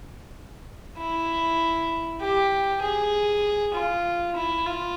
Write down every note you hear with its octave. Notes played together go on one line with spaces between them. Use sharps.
E4
G4
G#4
F4
E4
F4